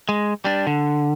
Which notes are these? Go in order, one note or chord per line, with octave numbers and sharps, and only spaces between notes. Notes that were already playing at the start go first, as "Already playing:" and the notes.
G#3
G3 D4
D3